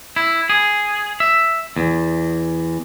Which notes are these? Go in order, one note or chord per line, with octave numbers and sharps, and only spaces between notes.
E4
G#4
E5
E2